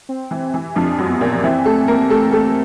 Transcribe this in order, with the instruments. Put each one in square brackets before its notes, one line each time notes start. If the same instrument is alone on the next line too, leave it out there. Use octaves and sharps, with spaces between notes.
[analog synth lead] C4
[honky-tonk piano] E3
E3
[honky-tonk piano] F2 F3 [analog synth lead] D4
[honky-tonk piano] F#2 F#3
[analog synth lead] B3
[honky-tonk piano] A#2 A#3
[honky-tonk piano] E3 E4 [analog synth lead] C4
[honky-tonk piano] A3 A4
A#3 A#4
A3 A4
A3 A4